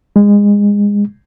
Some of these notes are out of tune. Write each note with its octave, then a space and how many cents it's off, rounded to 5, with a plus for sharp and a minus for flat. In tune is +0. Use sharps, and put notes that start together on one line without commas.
G#3 -25